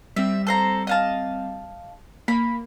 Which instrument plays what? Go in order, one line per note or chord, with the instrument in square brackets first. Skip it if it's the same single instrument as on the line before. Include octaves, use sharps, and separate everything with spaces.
[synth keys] G3 C4 [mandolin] E5
[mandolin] A4 C5 A#5
D#5 F5 A5
[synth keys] A#3 [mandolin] B5